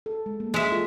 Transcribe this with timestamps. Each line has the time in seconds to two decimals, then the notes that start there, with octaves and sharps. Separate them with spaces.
0.06 A4
0.26 G#3
0.40 A#3
0.54 G#3 E5
0.70 F4 A4